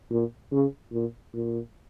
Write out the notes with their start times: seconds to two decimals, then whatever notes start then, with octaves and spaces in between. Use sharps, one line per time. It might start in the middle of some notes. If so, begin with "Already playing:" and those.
0.11 A#2
0.52 C#3
0.93 A#2
1.34 A#2